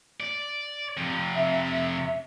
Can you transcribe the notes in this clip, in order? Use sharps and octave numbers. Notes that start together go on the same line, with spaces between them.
D5
F2 C3
E5